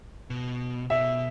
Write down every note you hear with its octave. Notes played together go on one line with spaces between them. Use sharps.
B2
B2 E5